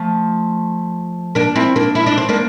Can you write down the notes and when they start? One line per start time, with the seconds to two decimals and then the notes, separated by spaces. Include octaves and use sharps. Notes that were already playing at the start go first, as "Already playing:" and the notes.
Already playing: F3 A3
1.35 A#3 D4
1.56 C4 E4
1.76 A#3 D4
1.95 E4
2.06 D4
2.18 C4
2.29 A#3 D4